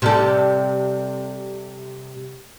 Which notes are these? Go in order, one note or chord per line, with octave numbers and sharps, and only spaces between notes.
C3 G3 A4